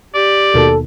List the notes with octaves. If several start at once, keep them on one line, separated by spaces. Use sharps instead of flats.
G4 D5
D#2 B2 D#3 A4